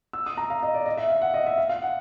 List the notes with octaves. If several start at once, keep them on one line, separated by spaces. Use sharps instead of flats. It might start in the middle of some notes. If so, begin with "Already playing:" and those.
E6
D#6
A#5
F5
D#5
D5
D#5
E5
F5
F#5
D#5
E5
F5
F5
F#5